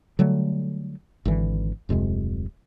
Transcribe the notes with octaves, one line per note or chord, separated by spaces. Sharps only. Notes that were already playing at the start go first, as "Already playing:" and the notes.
D3 F#3 G3 A3
G#1 D3 E3
D1 F2 C3 G#3